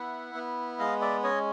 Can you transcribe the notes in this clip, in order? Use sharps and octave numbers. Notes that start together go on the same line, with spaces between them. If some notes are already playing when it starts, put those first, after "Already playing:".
Already playing: B3 E4 E5 F#5
B3
G#3 D#5 F5
D5 E5
C#4 C#5 D#5